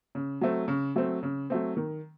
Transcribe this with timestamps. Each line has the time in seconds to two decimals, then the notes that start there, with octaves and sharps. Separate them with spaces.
0.15 C#3
0.41 F#3 A3 C4
0.68 C#3
0.96 F#3 A3 C4
1.23 C#3
1.50 F#3 A3 C4
1.77 D#3